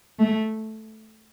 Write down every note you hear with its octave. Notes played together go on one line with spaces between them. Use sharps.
A3